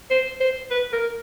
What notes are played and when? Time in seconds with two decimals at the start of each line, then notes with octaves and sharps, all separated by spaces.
0.11 C5
0.40 C5
0.71 B4
0.93 A#4